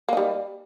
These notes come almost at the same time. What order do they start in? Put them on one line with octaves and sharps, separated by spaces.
A#3 D#4 G3